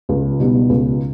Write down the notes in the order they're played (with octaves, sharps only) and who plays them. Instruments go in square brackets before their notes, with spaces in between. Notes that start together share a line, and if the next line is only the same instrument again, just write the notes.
[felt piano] C#2
B2 G3 B3 D#4
C#2